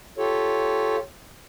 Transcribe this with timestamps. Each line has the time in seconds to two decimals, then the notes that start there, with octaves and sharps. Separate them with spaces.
0.18 F4 G4 A4 C#5